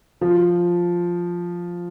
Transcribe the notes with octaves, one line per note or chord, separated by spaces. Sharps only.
F3